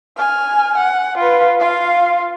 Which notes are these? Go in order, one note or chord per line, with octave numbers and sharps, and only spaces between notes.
G#5 F6
F#5
F4 B4
F4 F5